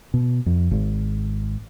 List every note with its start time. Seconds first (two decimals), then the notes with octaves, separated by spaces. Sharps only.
0.14 B2
0.46 F2
0.71 G#1